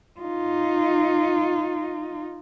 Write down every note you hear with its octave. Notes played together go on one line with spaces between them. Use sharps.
D#4 F4